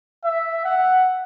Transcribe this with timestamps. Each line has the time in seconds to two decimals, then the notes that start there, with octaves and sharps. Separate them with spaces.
0.24 E5
0.65 F#5